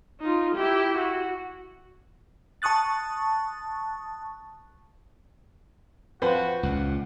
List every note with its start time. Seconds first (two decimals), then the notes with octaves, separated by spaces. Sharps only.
0.20 D#4 F4
0.55 E4 G4
0.97 F#4
2.62 A5 C#6 D#6 F#6 A6
6.22 F3 C4 F#4 B4 C5 F5
6.63 C#2 A#2 F#5